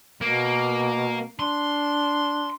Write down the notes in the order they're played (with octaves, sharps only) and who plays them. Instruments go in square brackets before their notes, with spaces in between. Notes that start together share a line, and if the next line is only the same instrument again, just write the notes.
[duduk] B2 [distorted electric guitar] A#3
[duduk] D4 [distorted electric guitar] C6